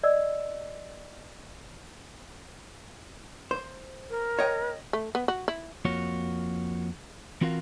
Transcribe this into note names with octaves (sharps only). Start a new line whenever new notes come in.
D5 D#5 E6
C5
A#4
C#5 D#5 G5
A3
B3
F#4
E4
F2 A#3 F4 F#4 C#5
E3 C4 F4 F#4 A#4 F5